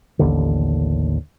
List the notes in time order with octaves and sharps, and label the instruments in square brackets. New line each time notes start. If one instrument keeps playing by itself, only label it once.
[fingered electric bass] A1 D#2 D3